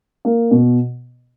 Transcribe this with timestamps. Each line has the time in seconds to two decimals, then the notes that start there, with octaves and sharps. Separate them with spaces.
0.25 A#3
0.51 B2